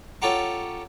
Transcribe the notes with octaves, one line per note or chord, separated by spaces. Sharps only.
C#4 F4 G4 A4 F#5 A#5